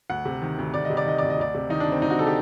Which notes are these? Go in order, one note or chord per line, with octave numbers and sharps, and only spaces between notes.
D2 F#5
C3
D#3
D2
D2 D5
D#5
C3
D5
D#3 D#5
D2 D5
D#5
D2 D5
C3
D#3 D#4
D4
D2
C4
D2 D#4
F#4
C3 A4
G4